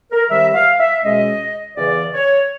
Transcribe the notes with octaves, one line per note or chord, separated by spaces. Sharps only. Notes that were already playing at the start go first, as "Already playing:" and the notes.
A#4
C3 D#3 G3 E5
F5
E5
C#2 B2 G#3 C#4 D#5
E2 C#3 E3 D5
C#5